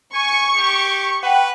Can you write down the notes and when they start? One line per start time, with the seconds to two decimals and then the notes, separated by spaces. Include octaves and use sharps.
0.14 G#5 C#6
0.56 G4
1.23 B4 F#5 G5